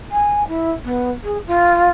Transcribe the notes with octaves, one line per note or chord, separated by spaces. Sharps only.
G#5
E4
B3
G#4
F4